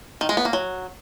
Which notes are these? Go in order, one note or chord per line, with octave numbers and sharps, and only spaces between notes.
D#3
G#3
B3
A#3
F#3